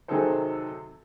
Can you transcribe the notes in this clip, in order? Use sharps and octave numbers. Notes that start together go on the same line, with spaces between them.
C3 D#3 F#3 G#4 A4 C5